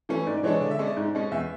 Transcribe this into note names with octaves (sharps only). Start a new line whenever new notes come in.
E3 A3 C#4
G#2 D5
D5
E3 G#3 D4 C#5
D3 D5
E5
G#3 C#4 D5
G#2
G#3 C#4
E2 E5